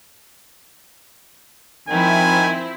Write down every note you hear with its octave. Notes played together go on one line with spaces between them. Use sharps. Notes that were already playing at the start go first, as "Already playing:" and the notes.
D#3 F3 C4 E4 G#5